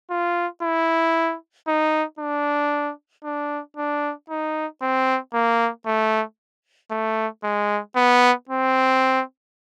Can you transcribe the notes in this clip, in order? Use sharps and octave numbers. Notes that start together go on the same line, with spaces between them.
F4
E4
D#4
D4
D4
D4
D#4
C4
A#3
A3
A3
G#3
B3
C4